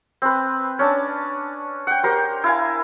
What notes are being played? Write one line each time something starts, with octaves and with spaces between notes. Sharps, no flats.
C4 B4
C#4 D4 A5
F#5 G5
G4 A#4 C5
E4 F5 G#5